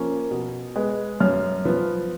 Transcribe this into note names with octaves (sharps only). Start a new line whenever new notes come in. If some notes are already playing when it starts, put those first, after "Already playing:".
Already playing: F3 A#3 C#4
B2
G#3 B3
F#2 F6
F3 B3